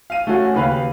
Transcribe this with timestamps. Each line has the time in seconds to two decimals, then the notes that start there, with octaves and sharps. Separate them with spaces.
0.10 F5 D#7
0.27 A3 C#4 F#4
0.54 D#2 C#3 B4 F5